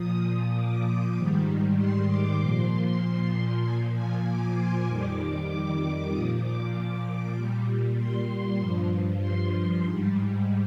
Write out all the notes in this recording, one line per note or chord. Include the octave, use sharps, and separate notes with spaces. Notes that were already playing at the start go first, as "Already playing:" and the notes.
Already playing: A#2 F3 D#6
D6
G#2 D#3 G3
C6
D6
A#2 F3 C6
A#2 F3 G#5
G#5
D6
C6
F2 D#3 G3 D6
A#2 F3 D#6
D6
A#2 G3
C6
G2 F3
C6
G#2 G3